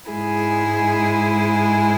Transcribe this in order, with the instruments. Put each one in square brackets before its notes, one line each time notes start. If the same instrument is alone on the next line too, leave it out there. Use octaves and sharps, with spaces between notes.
[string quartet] G#2 G#3 E4 G#4